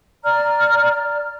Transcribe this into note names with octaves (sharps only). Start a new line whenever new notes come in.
D5 A#5 F6